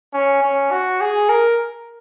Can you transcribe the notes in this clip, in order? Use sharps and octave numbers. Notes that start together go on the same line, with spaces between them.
C#4
C#4
F#4
G#4
A#4